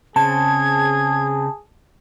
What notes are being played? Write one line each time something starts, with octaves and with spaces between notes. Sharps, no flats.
C#3 C4 G#4 C5 A5 G#6